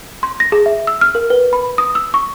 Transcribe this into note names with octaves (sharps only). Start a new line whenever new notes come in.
C6
A#6
G#4
E5
E6
F6
A#4
B4
B5
D#6
E6
C#6